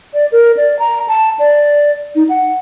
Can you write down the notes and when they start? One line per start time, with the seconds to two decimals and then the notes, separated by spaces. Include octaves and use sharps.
0.14 D5
0.32 A#4
0.57 D5
0.79 A#5
1.08 A5
1.39 D5
2.15 D#4
2.29 F#5